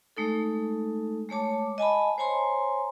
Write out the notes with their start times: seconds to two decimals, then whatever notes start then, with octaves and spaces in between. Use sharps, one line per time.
0.17 G#3 A3 D#4 A4
1.29 G#3 A3 C#5 A5 D6
1.78 D#5 G#5 A5 B5
2.18 C5 C#5 G#5 A#5 C6